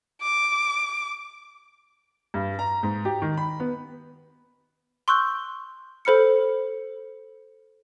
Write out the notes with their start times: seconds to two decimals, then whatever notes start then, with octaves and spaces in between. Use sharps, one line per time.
0.22 D6
2.34 G2
2.59 A#5
2.83 G#2
3.05 G4
3.22 D#3
3.37 B5
3.60 B3
5.08 C6 C#6 E6 F#6 G6 G7
6.05 A4 C5 B5 F6 C#7